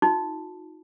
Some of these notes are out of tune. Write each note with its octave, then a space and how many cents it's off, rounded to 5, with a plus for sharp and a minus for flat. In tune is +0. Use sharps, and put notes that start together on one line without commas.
D#4 +15 F#4 -40